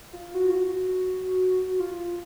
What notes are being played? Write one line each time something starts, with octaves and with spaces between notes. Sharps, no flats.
F4
F#4
F4
F#4
F4